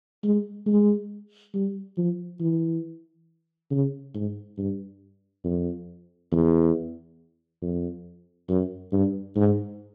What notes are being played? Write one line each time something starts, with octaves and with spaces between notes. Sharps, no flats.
G#3
G#3
G3
F3
E3
C#3
G#2
G2
F2
E2
F2
F#2
G2
G#2